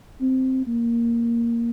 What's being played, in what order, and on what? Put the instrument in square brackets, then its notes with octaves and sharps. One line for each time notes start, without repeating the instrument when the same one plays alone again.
[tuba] C4
A#3